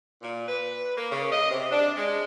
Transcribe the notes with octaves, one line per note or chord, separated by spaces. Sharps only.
A#2
B4
A#3
C#3
D#5
C3
D4
G#3